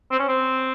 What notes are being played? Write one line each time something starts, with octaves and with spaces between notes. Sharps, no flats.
C4
C#4
C4